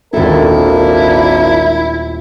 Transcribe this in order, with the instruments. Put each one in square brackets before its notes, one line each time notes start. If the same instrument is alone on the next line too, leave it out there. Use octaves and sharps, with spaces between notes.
[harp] D#1 A4 [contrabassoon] G#1 [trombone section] A#3 D4 A#4 [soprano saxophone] E4